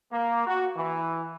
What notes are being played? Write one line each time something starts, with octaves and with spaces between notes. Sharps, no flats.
A#3
F#4
E3